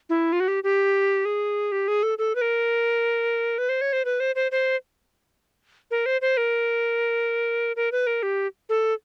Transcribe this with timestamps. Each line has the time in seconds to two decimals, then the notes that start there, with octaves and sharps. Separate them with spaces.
0.10 E4
0.32 F4
0.40 F#4
0.48 G4
0.64 G4
1.25 G#4
1.72 G4
1.88 G#4
2.03 A4
2.18 A4
2.35 B4
2.41 A#4
3.58 B4
3.69 C5
3.81 C#5
3.93 C5
4.05 B4
4.20 C5
4.36 C5
4.52 C5
5.91 A#4
6.06 C5
6.21 C5
6.37 A#4
7.76 A#4
7.92 B4
8.07 A#4
8.23 G4
8.69 A4